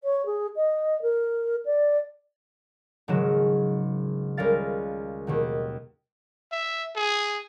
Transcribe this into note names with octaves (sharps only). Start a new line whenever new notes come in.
C#5
G#4
D#5
A#4
D5
G#1 C#3 F#3 G#3 E7
C#2 G3 C#4 A#4 F5 A6
D#2 B2 D#3
E5
G#4